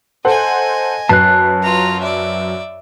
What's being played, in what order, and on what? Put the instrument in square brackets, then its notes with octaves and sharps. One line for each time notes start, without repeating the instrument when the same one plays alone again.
[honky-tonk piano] A4 C5 F#5 [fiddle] D#5 G#5
[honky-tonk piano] F#2 B4 C7 [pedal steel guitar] A5 F#6
[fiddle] F4 A#5
D5 E5